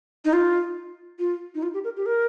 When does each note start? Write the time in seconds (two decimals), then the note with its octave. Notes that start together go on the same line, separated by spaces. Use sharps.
0.25 D#4
0.33 F4
1.19 F4
1.55 D#4
1.63 F4
1.74 G4
1.84 A#4
1.97 G4
2.06 A#4